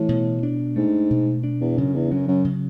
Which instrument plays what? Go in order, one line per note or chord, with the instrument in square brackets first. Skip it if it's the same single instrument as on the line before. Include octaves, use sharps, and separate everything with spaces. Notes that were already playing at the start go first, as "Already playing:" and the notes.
Already playing: [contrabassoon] A2 [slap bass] E3
[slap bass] B2
D4
[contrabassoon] G#2 [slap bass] A3
[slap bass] B2
D4
[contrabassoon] E2
[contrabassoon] F#2 [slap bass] C#3
[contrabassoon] E2
[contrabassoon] F#2 [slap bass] F#3
[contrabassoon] F#2
[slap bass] C#3